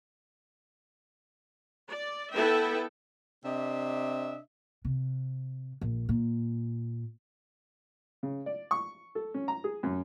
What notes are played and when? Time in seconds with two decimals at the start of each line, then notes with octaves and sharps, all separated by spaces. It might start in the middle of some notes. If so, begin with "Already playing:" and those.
1.91 D5
2.34 B3 E4 A4 B4 E5 G5
3.45 C3 C4 D4 D#5 E5
4.85 C3
5.81 A#1
6.09 A#2
8.23 C#3
8.46 D5
8.71 C#6
9.15 A4
9.34 C#4
9.48 A#5
9.64 G#4
9.83 F#2